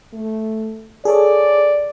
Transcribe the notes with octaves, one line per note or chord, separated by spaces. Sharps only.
A3
G#4 A4 C#5 D5